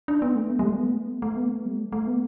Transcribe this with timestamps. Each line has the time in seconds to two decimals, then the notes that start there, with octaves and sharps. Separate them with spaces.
0.08 D4
0.22 B3
0.36 A3
0.50 B3
0.59 G3
0.65 A3
0.79 B3
0.94 A3
1.22 A3
1.37 B3
1.50 A3
1.65 G3
1.79 A3
1.92 A3
2.07 B3